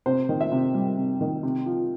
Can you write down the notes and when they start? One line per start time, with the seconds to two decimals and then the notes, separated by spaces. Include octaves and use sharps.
0.06 C3 C5
0.29 D#3
0.40 E5
0.52 C3
0.74 G3
0.97 C3
1.21 D#3
1.43 C3
1.66 F3